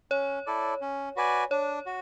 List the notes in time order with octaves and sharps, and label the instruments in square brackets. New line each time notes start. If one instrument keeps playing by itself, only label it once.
[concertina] C#4 [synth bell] C#5
[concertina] E4 A4 D5
C#4
F#4 B4 D5 G#5
[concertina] D4 [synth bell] C#5
[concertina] F#4